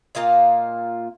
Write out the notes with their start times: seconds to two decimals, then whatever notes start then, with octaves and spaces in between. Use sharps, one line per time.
0.15 A#2 A#3 F4 D#5